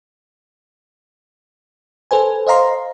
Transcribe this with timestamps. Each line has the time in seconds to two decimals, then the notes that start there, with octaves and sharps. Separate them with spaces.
2.11 A4 B4 C5 G#5
2.47 C5 D#5 F5 A#5 C6